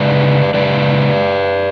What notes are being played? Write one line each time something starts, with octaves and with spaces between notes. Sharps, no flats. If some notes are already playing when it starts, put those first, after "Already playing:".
Already playing: C#3 G#3 B4 D5
C#3 G#3 B4 D5